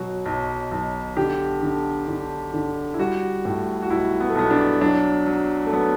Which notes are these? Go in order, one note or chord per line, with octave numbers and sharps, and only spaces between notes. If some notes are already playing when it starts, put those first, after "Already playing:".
Already playing: B2 F#3 F#4
B1
B1
D3 G4
D3
D3
D3
E4
G3 F#4
A2
F#4
B1 E4
B3
A3
B1 B3
D4
F#3 D4
F#3
A3
F#3 B3